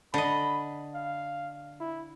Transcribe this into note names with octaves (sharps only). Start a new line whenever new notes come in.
D3 D#5 B5
F5
E4